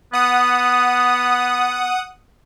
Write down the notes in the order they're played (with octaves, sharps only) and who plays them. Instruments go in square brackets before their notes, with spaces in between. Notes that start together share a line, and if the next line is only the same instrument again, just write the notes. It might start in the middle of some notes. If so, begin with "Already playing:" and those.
[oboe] B3 [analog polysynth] F#5 D#6